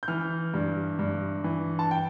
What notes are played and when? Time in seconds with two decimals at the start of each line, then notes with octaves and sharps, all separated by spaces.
0.03 G6
0.08 E3 F6
0.54 G2
0.99 G2
1.44 E3
1.79 A5
1.91 G5